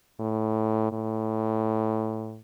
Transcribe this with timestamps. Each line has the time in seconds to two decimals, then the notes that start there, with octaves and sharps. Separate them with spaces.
0.19 A2
0.92 A2